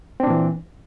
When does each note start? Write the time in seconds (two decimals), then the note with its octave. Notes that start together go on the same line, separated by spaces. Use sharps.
0.20 C4
0.23 D4
0.27 A#2
0.30 E3